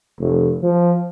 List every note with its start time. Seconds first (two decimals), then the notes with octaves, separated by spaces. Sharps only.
0.19 F1
0.63 F3